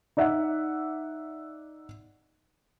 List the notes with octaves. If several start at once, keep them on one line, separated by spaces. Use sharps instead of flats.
D#4 D5 E5 F#5